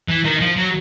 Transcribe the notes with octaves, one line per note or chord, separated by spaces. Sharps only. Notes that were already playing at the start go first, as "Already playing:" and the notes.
E3
D#3
F3
F#3